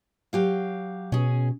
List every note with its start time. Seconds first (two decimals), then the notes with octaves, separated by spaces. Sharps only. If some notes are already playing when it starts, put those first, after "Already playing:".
0.33 F#3 G4 F5
1.12 B2 C#4 G#4